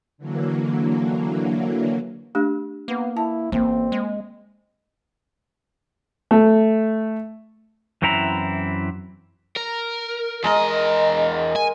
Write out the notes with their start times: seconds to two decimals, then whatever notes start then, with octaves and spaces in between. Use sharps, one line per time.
0.18 D3 E3 F#3 A#3
2.35 A3 D4 G4
2.88 A#3 B3
3.17 E4 A5
3.52 A1 A#3 C4
3.92 G#3
6.31 A3
8.02 F#2 E3 C4 E4 A#5
9.56 A#4
10.44 E2 G#3 A#4 D#5
11.56 G#5